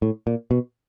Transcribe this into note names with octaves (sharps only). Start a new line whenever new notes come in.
A2
A#2
B2